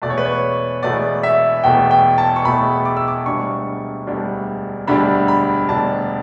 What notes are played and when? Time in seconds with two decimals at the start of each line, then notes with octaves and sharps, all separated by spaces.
0.02 E1 E2 B2 A3 D5
0.10 C#5
0.18 B4
0.25 C#5
0.83 E1 E2 B2 A3 D5
1.23 E5
1.64 E1 E2 B2 A3 G5
1.91 G5
2.18 A5
2.36 C#6
2.45 E1 E2 B2 A3 B5
2.85 D6
2.97 E6
3.08 D6
3.26 E1 D2 D3 G3 D4 C#6
4.07 E1 D2 D3 G3 D4
4.87 E1 D2 D3 G3 D4 B5
5.28 B5
5.69 E1 D2 D3 G3 D4 A5